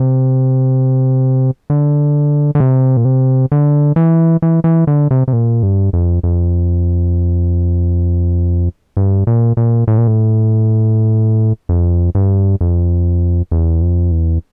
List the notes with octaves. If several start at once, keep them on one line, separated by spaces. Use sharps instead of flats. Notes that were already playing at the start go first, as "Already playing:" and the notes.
Already playing: C3
D3
D3
C3
A#2
C3
D3
E3
E3
E3
D3
C3
C3
A#2
G2
F2
F2
G2
A#2
A#2
A2
A#2
A2
F2
G2
F2
E2
F2
E2